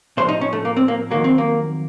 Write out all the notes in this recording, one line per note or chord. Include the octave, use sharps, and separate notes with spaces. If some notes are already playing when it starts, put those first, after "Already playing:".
A2 F3 C5
D#4
C#4
A3
A#3
C4
A#3
F2 D#3 F#3 A#3
C4
A#3